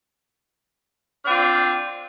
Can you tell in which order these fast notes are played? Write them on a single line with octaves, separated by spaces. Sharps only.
D4 C4 F4